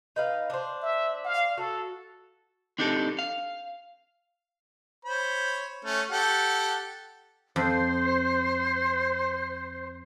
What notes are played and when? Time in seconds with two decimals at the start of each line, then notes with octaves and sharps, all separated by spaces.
0.16 D#4 B4 F5
0.50 D4 C5
0.82 E5
1.25 F5
1.57 F#4 A4
2.79 C4 D4 D#4 G4 A4
3.19 F5
5.05 C5 C#5 B5
5.85 A3 C#4
6.11 G4 A4 F#5
7.56 F2 C5